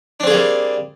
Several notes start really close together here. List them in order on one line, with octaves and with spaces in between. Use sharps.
D4 C4 G#4 A#3 G3